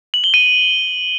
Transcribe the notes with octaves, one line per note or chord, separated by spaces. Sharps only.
F#7
G7
D#7